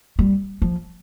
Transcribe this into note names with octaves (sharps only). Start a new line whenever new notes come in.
G3
F3